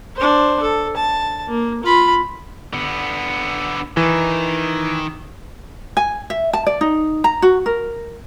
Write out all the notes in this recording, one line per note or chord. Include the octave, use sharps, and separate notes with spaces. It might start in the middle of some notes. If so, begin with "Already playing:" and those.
D4 C5
A4
A5
A#3
F4 B5
D3 B3
D#3 E3
G#5
E5
A5
D5
D#4
A#5
F#4
A#4